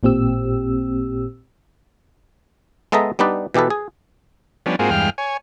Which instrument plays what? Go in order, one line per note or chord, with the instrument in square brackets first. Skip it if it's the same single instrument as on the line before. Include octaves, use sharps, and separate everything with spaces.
[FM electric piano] A1 A#2 C4 G4 E6
[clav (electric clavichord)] G#3 B3 A4 D#5 E5 A#5
G3 B3 D4 D#4 B4 D5
B2 E3 G4 A4 B4
G#4
[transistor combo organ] F3 G3 B3 C#4 D4
G#2 A#3 C4 F4 F#4 G#4
E2 G2 G#3 F5 G5 F6
C#5 G#5